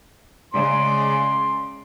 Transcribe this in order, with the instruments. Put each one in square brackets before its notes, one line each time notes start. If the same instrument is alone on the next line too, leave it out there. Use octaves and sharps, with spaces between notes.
[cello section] C#3 G#3 D5 [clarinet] C6